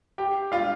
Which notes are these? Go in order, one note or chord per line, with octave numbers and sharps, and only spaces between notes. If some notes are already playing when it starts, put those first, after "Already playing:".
G4 G5
F4 F5